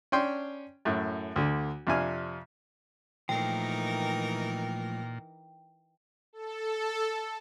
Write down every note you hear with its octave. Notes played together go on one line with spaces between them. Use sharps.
C#4 D4 G5 C6
F#2 A2
D2 D3
F2 C3 D4 G#5 F6
A#2 E3 F3 A3 D#4 A#4 G5
A4